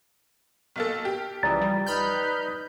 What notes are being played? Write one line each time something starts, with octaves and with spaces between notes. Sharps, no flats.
B1 A#3 A4 F6
G4
C#2 E3 F3 D5 A#5 D#6 A6
G3
D#4 B4 B5 D#6 F6 G6